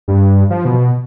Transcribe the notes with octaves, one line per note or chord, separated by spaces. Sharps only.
G2
F3
B2